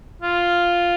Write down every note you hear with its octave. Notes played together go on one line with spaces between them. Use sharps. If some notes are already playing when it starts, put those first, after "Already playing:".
F4